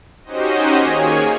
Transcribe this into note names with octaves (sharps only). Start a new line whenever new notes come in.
C#4 D#4 F#4 G4 C5 D#5
D#3 A#3 G#4 C#5 G#5